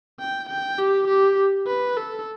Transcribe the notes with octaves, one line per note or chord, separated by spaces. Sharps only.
G5
G5
G4
G4
B4
A4